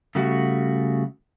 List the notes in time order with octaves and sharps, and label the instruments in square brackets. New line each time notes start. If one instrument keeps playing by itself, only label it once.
[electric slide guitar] C#3 G3 A3 F#4